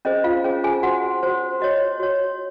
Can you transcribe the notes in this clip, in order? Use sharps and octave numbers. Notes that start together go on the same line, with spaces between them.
C#4 G#4 C5 D#5
F4 F5
C#4 G#4 C5
G#4 G#5
F#4 C5 F#5
F#4 C5
F#4 C#5 D#5
F#4 C#5